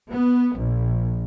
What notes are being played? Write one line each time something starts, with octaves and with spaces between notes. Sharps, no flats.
B3
A#1